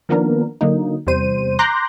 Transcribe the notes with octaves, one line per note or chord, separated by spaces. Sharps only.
D#3 F3 A#3 B3 D4 A#4
D3 F#3 A#3 D#4
E2 C3 G3 C5 D#7
A#5 C6 D6 F#6 G6 A#6